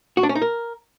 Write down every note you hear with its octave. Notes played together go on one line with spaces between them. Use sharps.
F#4
D4
C#4
D#4
A#4